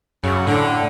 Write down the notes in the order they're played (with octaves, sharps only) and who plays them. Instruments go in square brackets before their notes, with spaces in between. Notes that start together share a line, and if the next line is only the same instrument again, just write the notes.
[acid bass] F#2 [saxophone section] C#3 F#3
[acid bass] A2 [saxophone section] D3